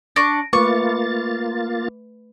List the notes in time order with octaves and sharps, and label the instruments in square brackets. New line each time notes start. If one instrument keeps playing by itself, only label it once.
[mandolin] D4 C#6 [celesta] A#6 D7
[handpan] A3 B4 [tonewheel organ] A#3 F4 A6 [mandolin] C#6 [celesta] D6